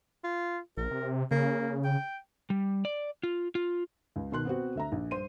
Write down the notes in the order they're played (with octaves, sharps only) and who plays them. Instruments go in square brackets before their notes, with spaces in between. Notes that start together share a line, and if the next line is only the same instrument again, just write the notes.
[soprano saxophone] F4
[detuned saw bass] A#1 [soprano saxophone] A#4
[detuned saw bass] C3
[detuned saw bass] C#3 [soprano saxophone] A#3
[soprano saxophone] G5
[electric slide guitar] G3
D5
F4
F4
[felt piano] C#2
B2 D#3 C6 F#6
B3 C4 F#4
D2 E5 A#5
A#1
G2 C5 C6 D#7